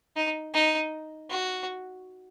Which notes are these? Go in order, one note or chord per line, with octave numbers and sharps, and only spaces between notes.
D#4
D#4
F#4